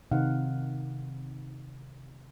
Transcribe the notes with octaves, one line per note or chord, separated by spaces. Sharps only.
C3 D#3 C4 D#4 F5 F#5